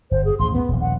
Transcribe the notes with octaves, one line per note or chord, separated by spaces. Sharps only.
G1 C5
G#4
A1 D#2 C6
B3
D#1 A#1
F#5